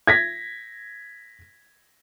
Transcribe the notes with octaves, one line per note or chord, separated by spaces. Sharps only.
G#6 A#6 B6